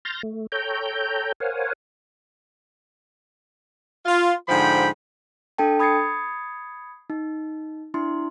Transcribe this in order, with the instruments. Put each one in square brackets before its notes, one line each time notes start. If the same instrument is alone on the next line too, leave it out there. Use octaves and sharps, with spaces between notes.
[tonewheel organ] C6 F6 G6 A6 A#6
A3
A4 C#5 G5 A#5 G6
A#4 C5 C#5 F5 F#5 G#5
[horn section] F4
G#2 D3 F3 G5 B5
[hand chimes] D4 A4 G5 A5
B5 D#6 G#6 A6 C7 C#7
D#4
D4 E4 C6